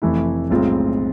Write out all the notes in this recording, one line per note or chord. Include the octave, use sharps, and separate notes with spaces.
F1 F2 E3 A3 E4
B1 A2 G#3 C4 F4